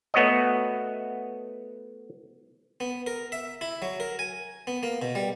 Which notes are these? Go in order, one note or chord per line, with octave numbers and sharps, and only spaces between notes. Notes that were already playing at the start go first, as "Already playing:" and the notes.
A3 B3 F#4 C#5 D#5
B3
A#4
E5
E4
F#3
A#4
G#5
B3
A#3
B2
G3